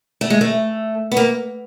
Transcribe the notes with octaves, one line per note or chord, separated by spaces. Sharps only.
A3
G#3
A3
B3
A#3